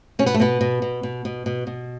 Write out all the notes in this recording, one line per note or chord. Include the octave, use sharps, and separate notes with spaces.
B2 C#4
B3
A3
B2 B3
B2
B2
B2
B2
B2
B2